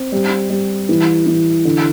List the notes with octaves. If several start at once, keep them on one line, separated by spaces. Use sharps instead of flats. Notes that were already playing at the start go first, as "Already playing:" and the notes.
Already playing: C4
G3
G3
E3
E3
D3